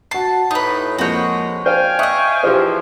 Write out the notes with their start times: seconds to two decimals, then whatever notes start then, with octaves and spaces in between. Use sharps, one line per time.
0.11 F#4 A5 C7
0.51 A2 D#4 B4 D#6
0.98 F2 G#3 A#3 F#4 A#4 C#5 G6
1.66 C5 D5 F5 G5 G#5 G6
1.99 D#5 E5 C#6 D#6 F#6
2.43 E3 F3 G4 G#4 C5